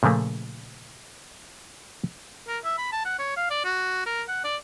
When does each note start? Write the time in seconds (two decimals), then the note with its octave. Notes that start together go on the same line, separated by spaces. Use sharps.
0.03 A#2 C#3 F3 A3 A#3
2.48 A#4
2.65 E5
2.78 B5
2.92 A5
3.05 F#5
3.19 C#5
3.37 F5
3.50 D5
3.64 F#4
4.06 A#4
4.28 F#5
4.44 D5